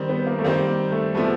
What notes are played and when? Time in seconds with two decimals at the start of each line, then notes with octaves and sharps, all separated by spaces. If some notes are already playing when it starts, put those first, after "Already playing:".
Already playing: D#3 G3 C4
0.09 B3
0.27 A#3
0.39 A3
0.44 D#3 G3 A#3 C4
0.68 A#3
0.92 A3
1.15 C3 F3 G#3 A3 B3